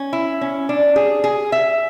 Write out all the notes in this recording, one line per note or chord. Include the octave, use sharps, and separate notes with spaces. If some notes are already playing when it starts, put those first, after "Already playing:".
Already playing: C#4
E4
C#4
D4
G#4
G#4
E5